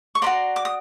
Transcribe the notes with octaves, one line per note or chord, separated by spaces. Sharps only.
C#6
F#4 B4 D5 A#5 C6
D6
D#6